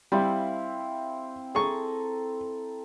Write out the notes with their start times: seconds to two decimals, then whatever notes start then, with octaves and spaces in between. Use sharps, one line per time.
0.12 G3 C4 E4 F5
1.55 G#4 A4 A#5 C#6